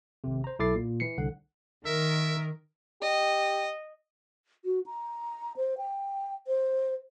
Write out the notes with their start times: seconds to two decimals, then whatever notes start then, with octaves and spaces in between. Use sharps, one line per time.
0.24 G#1 C3
0.44 C5 A#5
0.59 B1 E4 A4 D6 A6 C7
0.75 A#2
1.00 E3 C7 C#7
1.17 C2 D3 F#5
1.86 D#3 A#4 E5
3.02 G4 D#5
4.65 F#4
4.86 A#5
5.57 C5
5.78 G5
6.47 C5